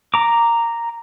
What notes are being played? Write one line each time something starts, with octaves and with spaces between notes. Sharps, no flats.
A#5 D6